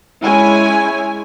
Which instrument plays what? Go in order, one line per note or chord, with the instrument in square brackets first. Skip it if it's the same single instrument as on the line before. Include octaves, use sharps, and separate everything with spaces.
[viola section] G#3 C#4 E4 C#5 G#5